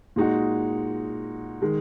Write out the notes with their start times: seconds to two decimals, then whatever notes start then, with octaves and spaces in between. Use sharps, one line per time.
0.16 A#2 G#3 D#4 F#4
1.62 D#3 G#3